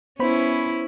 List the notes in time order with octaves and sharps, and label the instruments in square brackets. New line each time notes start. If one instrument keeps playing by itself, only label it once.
[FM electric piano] B3 C5 B5 [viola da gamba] C#4 E4